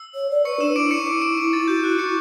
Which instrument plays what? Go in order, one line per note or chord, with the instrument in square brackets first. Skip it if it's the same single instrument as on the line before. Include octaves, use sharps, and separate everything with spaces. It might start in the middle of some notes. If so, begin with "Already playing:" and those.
Already playing: [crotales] E6
[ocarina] C#5
D5
[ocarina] B4 [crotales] C#6 C#7
[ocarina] D4 [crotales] E6 E7
[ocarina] E4 [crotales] D6 D7
[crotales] C#6 C#7
D6 D7
D6 D7
[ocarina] E4 [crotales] D6 D7
[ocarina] E4 [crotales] A6
[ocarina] F#4 [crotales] G6
[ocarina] E4 [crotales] F#6
[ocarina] F#4 [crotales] C#6 C#7